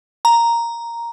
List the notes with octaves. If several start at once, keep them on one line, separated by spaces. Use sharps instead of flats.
A#5